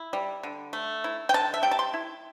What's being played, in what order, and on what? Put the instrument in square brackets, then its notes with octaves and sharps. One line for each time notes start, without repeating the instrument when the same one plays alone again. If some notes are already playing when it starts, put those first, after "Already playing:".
Already playing: [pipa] E4
G3
D3
A3
E4
G5
D3 A5
E5
G3 G5
A5
C6
E4